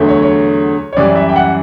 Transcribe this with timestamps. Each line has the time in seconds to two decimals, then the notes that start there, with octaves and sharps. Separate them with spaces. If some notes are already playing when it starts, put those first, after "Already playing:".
Already playing: E2 D3 F#3 A3
0.08 C#5
0.23 C#5
0.93 C#5
0.97 F#2 E3 G3 D5
1.15 E5
1.29 G5
1.36 F#5